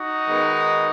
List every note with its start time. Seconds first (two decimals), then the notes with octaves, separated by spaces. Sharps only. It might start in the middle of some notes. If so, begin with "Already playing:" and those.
Already playing: D#4 F#4
0.27 D#3 G#3 B3